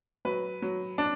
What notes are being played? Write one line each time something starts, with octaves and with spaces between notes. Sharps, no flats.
F#3 B4
F#3
D4